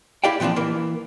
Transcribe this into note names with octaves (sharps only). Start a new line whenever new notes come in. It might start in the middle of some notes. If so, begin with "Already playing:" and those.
E4 G4 D5 F5 G5
A#2 E3 F3 C4 D4
E3 A#3